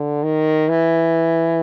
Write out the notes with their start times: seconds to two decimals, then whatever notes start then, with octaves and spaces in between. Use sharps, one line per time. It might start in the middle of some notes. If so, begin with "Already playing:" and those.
Already playing: D3
0.23 D#3
0.69 E3